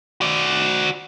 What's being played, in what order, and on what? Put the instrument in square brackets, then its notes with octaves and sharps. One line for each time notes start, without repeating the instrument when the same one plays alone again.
[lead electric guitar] F#4 D5